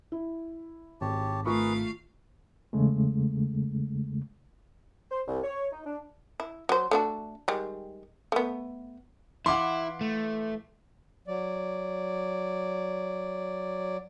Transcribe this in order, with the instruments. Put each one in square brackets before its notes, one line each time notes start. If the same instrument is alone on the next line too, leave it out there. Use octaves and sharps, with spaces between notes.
[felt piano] E4
[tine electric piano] G#1 [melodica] G4 C#5 A5
[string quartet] A3 F5 [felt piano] F4 C#6 [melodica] G#4 A#4 B4
[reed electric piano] E2 C#3 G#3 A3
[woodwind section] C5
C2
C#5
D#4
D4
[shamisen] E4
F#3 C5
A3 D4 F#4
D#3 G3 G#3
A3 B3
[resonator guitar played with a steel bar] E3 F5 F#5 [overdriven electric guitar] E4 [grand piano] C6 D6
[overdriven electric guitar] A3
[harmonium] F#3 D5